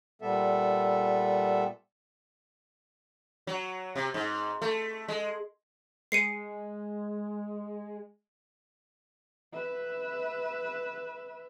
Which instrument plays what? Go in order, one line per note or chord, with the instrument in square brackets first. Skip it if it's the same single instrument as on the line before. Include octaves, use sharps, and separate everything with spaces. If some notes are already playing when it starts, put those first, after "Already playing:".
[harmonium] A#2 G3 B3 A4 E5
[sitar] F#3
C3
G#2
A3
G#3
[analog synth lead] G#3 [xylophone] C7 C#7 D#7
[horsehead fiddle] B4 E5